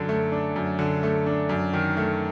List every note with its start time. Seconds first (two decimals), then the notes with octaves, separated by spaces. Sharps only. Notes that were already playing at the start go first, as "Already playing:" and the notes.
Already playing: F#2 D3
0.09 A3
0.32 D4
0.56 F#2
0.79 D3
1.03 A3
1.26 D4
1.49 F#2
1.73 D#3
1.97 A3